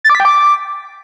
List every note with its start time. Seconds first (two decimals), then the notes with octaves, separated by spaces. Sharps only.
0.04 A6
0.10 D6
0.15 B6
0.20 G5
0.25 D6